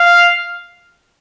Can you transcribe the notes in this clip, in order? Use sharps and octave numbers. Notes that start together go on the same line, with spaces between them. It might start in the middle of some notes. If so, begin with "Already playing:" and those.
Already playing: F5